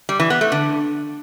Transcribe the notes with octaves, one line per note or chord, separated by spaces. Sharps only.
G3
E3
B3
A3
D3